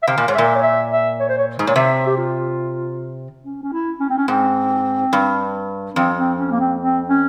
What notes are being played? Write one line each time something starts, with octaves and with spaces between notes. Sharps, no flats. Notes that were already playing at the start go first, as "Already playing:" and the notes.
E5
C3 F5
A#2
G#2 C#5
A#2 E5
C#5
E5
E5
C#5
C5
C#5
G#2
A#2 C#5
C3 E5
G4
F4
C#4
C#4
E4
C#4
C4
C#4
G#2 C4
G2
F2 C4
C4
C#4
A#3
C4
C4
C#4